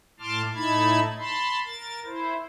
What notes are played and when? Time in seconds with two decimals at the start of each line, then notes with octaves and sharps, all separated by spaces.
0.20 A2 A5 C6 D6 F6
0.55 A2 D#4 E4 A5 B5 G#6
1.18 A5 B5 C6
1.65 A#4 A6
2.05 E4 C5